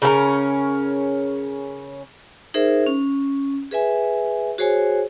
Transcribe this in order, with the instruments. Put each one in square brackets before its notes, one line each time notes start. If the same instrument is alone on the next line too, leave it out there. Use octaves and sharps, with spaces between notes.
[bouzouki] C#3 C#4 A4 A#4
[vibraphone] D#4 G#4 A#4 C5 E5
C#4
G#4 B4 E5 G#5
F#4 G#4 C5 C#5 G#5